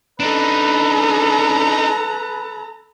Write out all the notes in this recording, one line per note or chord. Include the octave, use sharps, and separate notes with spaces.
D4 D#4 A4 B4 A#5